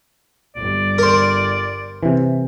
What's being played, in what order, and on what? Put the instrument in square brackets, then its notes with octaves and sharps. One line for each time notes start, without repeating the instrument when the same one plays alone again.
[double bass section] G1 G3 [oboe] D5
[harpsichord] A#4 C5
[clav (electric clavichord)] C3 E3